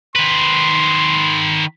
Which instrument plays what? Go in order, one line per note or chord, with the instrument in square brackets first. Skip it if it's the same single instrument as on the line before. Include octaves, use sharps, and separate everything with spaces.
[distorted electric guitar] D#3 B4 [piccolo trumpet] C6